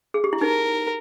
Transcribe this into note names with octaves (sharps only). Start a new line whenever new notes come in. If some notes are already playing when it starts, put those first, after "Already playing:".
G#4
G4
E4
D#4 A#4